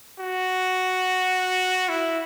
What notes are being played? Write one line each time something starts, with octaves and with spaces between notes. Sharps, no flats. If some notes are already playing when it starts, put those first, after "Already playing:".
F#4
E4